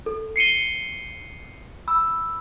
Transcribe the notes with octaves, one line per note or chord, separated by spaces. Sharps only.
A4
C7 C#7 D#7 G7
B5 E6